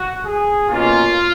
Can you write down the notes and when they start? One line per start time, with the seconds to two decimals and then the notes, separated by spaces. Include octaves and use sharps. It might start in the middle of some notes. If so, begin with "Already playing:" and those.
Already playing: F#4
0.25 G#4
0.70 B2 A#3 C#4 F4